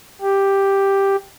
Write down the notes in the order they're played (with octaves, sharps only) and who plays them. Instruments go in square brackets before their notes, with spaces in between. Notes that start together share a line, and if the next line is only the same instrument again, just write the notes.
[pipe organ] G4